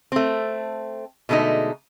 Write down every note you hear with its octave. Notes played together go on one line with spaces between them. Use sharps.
A3 C4
B2 D3 G#3 A3 D#4